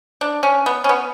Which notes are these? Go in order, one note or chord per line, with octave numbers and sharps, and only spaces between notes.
D4
C#4
B3
C#4
B3